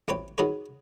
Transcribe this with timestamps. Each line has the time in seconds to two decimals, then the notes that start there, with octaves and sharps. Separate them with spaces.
0.08 A1 C4 B4 C#5 G5
0.38 D#3 F#3 G#4 B4 C#5